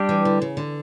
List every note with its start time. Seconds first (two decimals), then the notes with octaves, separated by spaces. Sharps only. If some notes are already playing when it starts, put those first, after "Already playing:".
Already playing: G3 D4 G4
0.09 E3
0.25 D3
0.42 C#3
0.57 D3